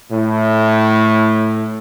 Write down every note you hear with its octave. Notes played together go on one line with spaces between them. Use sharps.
A2